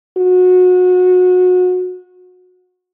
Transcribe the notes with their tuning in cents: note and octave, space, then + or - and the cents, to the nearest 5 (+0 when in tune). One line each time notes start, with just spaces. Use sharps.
F#4 -25